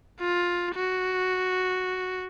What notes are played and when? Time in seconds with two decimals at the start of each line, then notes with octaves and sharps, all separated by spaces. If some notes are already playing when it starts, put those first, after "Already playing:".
0.20 F4
0.75 F#4